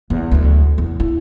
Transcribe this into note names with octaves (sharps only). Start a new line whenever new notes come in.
E2
D2 F#3
E2
E4